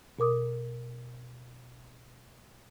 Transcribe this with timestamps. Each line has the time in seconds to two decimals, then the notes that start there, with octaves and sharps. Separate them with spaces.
0.19 B2 A#4 D6 D#6